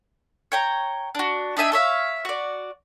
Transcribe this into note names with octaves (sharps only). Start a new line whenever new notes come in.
C#5 G5 A#5
D4 F#4
D4 D#4 E5 G#5
A4 C#5 E5 F5
F#4 D5